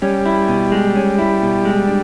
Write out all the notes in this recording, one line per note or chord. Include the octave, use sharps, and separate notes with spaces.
G3 C#4
E4
B2
G#3
C#4
E4
B2
G#3
D4